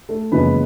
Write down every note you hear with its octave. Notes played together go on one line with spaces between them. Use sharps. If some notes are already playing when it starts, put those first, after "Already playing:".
A3 A4
F#1 E2 C#3 F3 G#3 B3 B4